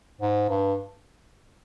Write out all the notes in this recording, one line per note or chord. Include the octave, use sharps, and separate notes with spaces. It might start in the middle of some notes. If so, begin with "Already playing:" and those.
G#2
G2